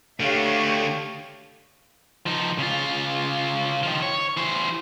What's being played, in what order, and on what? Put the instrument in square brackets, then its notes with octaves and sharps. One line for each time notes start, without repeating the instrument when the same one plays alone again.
[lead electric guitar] D3 A3 [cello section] G4 C#5 F5
[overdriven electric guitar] F3 D#4
C#3 F4
D#3 F3
C#5
E3 C5